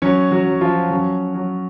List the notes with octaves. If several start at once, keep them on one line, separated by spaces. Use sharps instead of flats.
F#3 C#4 C#5
F#3 F#4
F#3
F3 F4
F#3 C#4
F#3